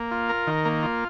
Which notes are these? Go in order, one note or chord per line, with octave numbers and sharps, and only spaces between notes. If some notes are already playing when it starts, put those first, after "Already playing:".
Already playing: A#3
F4
A#4
D#3
A#3
F4